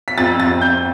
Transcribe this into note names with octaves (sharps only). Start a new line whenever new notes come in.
B6
F2 A6
A6
F2
G6